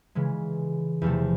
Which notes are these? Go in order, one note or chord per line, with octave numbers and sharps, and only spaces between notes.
C#3 E3 G#3
E2 C3 F3 A3